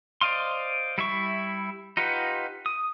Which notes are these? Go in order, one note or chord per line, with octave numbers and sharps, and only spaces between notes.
C5 D5 D#5 F5 C6
G3 E4 E5 C#6
D#4 F4 G4 B4 F#5
D#6